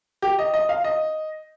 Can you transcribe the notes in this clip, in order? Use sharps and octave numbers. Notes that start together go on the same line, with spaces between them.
G4
D#5
D#5
F5
D#5